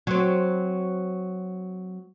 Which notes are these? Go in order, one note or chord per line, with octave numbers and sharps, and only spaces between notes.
F#3 C4